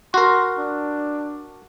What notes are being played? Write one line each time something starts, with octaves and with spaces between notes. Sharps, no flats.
F#4 A#4 C6
D4